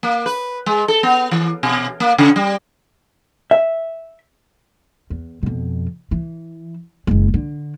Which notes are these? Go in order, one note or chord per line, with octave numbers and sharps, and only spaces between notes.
A#3
B4
G#3
A4
B3
E3
B2
A#3
C#3
G3
E5
E2
F2 B2
E3
F#1 G#3
D3